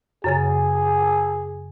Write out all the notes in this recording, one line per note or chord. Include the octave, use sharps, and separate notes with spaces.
F#2 C#3 G#4 A6